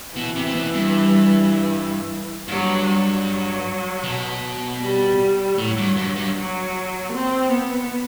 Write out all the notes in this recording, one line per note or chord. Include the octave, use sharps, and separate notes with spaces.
B2 E3
C3
C3
B2
G2
G2 F#3
F#3
B2
G3
A2 F#3
G2
G2
G2
F#3
C4
B3